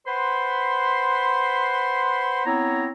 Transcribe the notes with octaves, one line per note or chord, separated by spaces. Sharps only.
B4 C5 F#5 B5 C6
B3 C4 E4 C#5 A#5